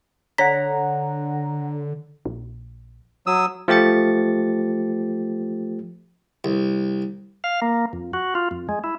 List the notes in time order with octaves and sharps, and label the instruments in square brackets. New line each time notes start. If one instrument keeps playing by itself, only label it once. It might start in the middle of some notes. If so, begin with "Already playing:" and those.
[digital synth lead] D3 [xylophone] C#5 B6 [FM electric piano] F#5 A#5
[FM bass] A#1
[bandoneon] F#3 D#6 E6
[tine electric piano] F3 A3 G4 A6 C#7
[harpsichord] C2
[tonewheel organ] F5
A#3
F2
F#4
F4
F2
G#3
E4